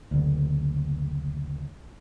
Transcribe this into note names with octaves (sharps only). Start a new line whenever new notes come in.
F#1 D2